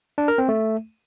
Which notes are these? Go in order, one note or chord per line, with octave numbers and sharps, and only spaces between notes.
D4
A#4
C4
A3